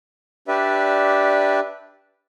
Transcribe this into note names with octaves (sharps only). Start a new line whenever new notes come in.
D4 G4 B4 D5 E5